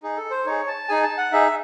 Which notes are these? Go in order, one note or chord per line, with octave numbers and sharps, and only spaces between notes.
D#4 G#4
A4
C5
D#4 G#4 C#5
A5
D#4 G#4 G#5
A5
F#5
D#4 G#4 E5